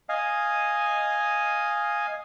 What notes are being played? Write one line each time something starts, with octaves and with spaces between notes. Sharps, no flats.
D#5 F5 G#5